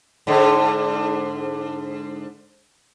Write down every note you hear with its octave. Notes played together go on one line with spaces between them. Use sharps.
G#2 D3